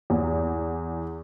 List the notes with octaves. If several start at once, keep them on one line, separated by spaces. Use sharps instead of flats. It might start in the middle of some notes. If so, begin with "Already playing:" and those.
E2